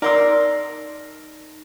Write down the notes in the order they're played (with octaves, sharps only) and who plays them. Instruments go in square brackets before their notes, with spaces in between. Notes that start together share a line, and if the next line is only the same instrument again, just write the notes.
[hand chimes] D#4 [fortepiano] A#4 C6 E6 [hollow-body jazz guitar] D5